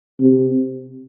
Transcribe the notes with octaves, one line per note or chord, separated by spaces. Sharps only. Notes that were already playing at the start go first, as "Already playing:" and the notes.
C3